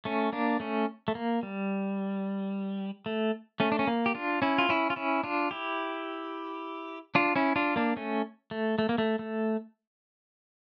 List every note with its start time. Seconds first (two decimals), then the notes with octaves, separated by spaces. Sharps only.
0.05 A3 C#4
0.33 A#3 D4
0.60 A3 C#4
1.08 A3
1.15 A#3
1.43 G3
3.06 A3
3.60 A3 C#4
3.72 D4
3.79 C#4
3.87 A#3
4.06 G4
4.15 D4 F4
4.42 C#4 E4
4.58 F4
4.69 C#4 E4
4.90 F4
4.96 C#4 E4
5.24 D4 F4
5.51 E4 G4
7.15 D4 F4
7.36 C#4 E4
7.56 D4 F4
7.76 A#3 D4
7.97 A3 C#4
8.51 A3
8.79 A3
8.89 A#3
8.98 A3
9.19 A3